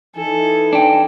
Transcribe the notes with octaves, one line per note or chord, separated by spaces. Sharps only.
E3 D#4 A4 G#5
D4 G5